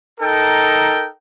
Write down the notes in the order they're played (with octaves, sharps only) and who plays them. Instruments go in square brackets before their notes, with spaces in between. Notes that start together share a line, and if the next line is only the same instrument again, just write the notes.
[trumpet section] D#4 A4 A#4 G5